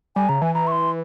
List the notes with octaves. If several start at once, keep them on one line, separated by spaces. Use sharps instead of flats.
G3 G#5
C#3 A#5
E3 G#5
E3 A#5
C#6
C6